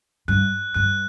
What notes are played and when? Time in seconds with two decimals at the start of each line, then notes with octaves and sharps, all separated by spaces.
0.28 G2 F#6
0.74 G2 F#6